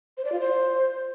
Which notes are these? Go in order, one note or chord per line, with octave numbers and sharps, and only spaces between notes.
C5
D5
F4
C5